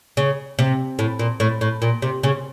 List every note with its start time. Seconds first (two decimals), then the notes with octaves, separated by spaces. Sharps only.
0.17 C#3
0.59 C3
0.99 A2
1.19 A#2
1.40 A2
1.61 A2
1.82 A#2
2.02 C3
2.23 C#3